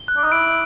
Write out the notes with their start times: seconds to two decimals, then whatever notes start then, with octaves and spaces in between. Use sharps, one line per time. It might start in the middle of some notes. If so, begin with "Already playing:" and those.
Already playing: G7
0.08 F#6
0.16 D4
0.24 D#4
0.32 E4 D7